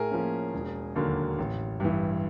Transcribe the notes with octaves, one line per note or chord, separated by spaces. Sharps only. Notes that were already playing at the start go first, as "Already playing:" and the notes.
Already playing: A2 G#4 A#4
F3 A#3 C#4
E1
D#2 D3 F#3 A#3
A1
G2 E3